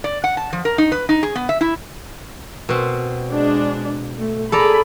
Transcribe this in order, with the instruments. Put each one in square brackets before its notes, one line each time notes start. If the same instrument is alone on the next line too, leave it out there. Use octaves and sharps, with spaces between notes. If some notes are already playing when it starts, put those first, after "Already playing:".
[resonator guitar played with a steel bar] D5
F#5
A5
F3
A#4
D#4
B4
D#4
G#4
B3
E5
E4
[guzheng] B2 C4
[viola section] G#3 D4
A3
[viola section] G#4 B5 [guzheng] A4 D5 A#5